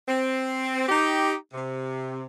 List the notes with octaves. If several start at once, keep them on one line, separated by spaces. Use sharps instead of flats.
C4
D#4 G4
C3